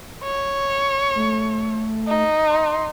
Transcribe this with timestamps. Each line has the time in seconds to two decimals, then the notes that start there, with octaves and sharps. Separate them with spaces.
0.23 C#5
1.15 A3
2.07 D#4
2.49 C6